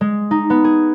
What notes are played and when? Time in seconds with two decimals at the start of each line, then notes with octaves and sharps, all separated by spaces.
0.01 G#3
0.31 D#4
0.50 B3
0.64 G#4